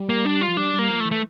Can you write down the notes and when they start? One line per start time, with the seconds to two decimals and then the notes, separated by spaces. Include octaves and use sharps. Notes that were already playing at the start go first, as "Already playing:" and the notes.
Already playing: G3
0.09 A#3
0.25 D4
0.41 F4
0.48 F3
0.57 G3 D4
0.73 G3
0.79 A#3
0.89 F3
1.00 A3
1.05 E3
1.11 A3